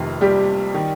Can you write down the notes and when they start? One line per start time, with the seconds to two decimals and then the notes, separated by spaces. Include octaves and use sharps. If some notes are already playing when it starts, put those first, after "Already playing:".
Already playing: F1 F2 C3 D#3 F4
0.21 G3 G4
0.74 D#3